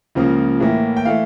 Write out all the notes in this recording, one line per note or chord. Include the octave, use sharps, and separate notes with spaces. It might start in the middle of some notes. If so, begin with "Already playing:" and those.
C#2 C#3 F3 A#3
A2 E3 A#3
G5
E3 A3 F5